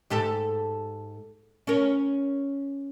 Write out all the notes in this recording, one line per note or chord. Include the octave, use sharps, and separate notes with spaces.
G#2 G4 A4
C#4 A#4